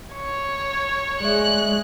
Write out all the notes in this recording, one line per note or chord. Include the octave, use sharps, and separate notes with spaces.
C#5
G#3 D5 E5 F#6